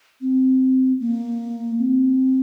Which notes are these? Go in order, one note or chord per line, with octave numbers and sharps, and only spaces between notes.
C4
A#3
C4